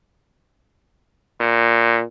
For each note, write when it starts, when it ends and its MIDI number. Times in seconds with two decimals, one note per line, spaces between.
1.41 2.03 46